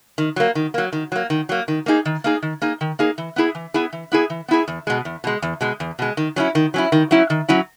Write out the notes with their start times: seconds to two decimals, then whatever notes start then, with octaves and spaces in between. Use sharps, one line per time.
0.18 D#3
0.36 F#3 A#3
0.55 D#3
0.74 F#3 A#3
0.93 D#3
1.12 F#3 A#3
1.30 D#3
1.49 F#3 A#3
1.68 D#3
1.86 A#3 D#4 G#4
2.05 D#3
2.24 A#3 D#4 G#4
2.42 D#3
2.62 A#3 D#4 G#4
2.81 D#3
2.99 A#3 D#4 G#4
3.18 E3
3.36 B3 E4 G#4
3.55 E3
3.74 B3 E4 G#4
3.92 E3
4.12 B3 E4 G#4
4.30 E3
4.48 B3 E4 G#4
4.68 E2
4.87 B2 G#3
5.05 E2
5.24 B2 G#3
5.42 E2
5.61 B2 G#3
5.80 E2
5.99 B2 G#3
6.17 D#3
6.36 F#3 C#4 E4
6.55 D#3
6.74 F#3 C#4 E4
6.92 D#3
7.11 F#3 C#4 E4
7.30 D#3
7.49 F#3 C#4 E4